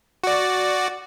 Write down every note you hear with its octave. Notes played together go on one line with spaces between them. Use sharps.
F#4 D5